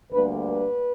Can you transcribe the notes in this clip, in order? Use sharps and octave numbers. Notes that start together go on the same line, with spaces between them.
D2 D3 G3 A#3 B4
B4